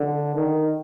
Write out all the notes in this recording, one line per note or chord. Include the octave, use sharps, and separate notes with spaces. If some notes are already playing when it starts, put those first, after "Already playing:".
Already playing: D3
D#3